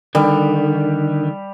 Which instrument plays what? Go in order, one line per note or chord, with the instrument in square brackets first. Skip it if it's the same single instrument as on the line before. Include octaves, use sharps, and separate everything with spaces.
[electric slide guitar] D3 D#3 [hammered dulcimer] G3